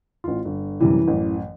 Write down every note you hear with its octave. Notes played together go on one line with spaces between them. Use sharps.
A1 F4
G1
F#2 C3 E3 G3
A1 F#2